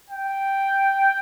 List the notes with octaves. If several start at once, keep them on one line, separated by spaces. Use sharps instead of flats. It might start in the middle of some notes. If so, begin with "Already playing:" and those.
G5